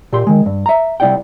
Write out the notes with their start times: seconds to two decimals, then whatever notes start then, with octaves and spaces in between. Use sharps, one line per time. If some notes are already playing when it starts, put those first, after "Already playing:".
0.13 A#2 G4 C6
0.27 D#3 G#3
0.46 G2
0.66 E5 A#5
1.00 C2 A#2 E4 D5 F#5 G5